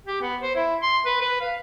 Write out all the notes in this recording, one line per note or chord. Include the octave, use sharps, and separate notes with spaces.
G4
B3
C5
E4
C6
B4
B4
F5